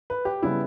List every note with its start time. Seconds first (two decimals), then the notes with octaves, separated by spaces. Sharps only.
0.10 B4
0.25 G4
0.43 C#3 G3 B3 E4